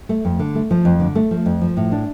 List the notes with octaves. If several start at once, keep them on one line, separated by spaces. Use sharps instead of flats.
A3
F2
D3
A3
F3
F2
D3
A3
F3
F2
F3
A2
D4